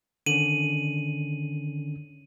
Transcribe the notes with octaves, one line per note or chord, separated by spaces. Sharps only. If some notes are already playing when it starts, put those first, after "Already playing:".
D3 D#3 C#4 D#7 F#7